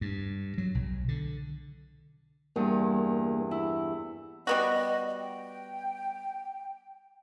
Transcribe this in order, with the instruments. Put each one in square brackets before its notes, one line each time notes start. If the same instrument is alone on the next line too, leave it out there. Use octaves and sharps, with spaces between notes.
[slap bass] G2
F#3
B1
D3
[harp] E2 G2 G#4 [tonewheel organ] A#3
[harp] E4
[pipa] G3 B3 F#4 [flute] D#5
[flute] G5